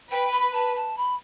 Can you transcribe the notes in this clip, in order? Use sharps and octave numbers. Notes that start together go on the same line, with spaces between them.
B4 G5
B5
A5
A5
B5